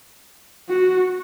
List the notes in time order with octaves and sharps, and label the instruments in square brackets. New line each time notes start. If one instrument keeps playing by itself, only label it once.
[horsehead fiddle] F#4